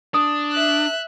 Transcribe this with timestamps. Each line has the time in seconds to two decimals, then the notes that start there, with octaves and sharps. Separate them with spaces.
0.14 D4 D#6
0.53 E5 F#6